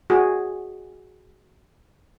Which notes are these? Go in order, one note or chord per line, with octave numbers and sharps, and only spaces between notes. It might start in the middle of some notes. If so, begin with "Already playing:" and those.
F#4 G#4